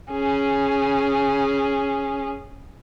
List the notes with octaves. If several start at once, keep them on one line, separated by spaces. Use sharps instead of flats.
C#4 G#4